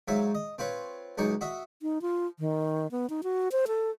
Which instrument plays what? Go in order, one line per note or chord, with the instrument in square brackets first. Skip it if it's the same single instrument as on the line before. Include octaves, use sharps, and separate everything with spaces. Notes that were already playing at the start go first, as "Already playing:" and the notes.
[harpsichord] G#2 F#3 C#5 E5 F5
D#5
C4 F4 B4 C#5
C#2 F#2 D#4 G#4 C#6
F#4 D#5 E5
[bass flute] D#4
F4
D#3
B3
D#4
F#4
C5
A4